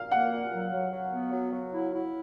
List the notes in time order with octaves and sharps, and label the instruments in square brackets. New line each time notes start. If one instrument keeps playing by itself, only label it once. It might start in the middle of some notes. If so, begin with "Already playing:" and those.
Already playing: [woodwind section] A#2 [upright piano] F5
[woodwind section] A#3 [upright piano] F#5
[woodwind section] A#2
F#3
F#3
F#3
B3
F#3
F#3
E4
E4